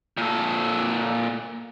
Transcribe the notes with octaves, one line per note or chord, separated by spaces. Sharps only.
A#2 A4